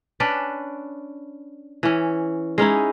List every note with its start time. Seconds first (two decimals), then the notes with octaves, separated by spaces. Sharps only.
0.20 C#4 D4 B4 D5
1.83 E3 C#4
2.58 G#3 C#4 D#4 E4